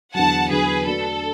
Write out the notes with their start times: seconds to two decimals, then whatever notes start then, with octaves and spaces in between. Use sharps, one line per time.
0.14 E2 D3 F#3 F#5 A5
0.50 E2 D3 F#3 G#4 B4
0.86 D3 A3 D4 F#4 A4